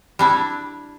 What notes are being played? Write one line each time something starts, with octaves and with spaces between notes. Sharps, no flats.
G3 D4 E4